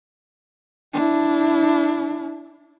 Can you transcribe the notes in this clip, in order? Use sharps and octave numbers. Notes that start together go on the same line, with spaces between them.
D4 E4